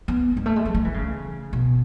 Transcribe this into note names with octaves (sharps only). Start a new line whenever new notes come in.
B3
G#3
A3
G#3
F#3
A3
E3
C#3
B2